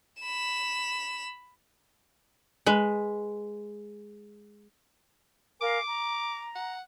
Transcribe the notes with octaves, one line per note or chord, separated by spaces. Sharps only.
B5 E7
G#3 B4
A#4 F5 G#5 D6
A#5
F#5